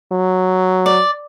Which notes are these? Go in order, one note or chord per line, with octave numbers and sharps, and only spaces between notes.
F#3
D5